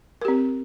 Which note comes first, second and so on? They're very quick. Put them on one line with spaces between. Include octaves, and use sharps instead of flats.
A#4 G4 C4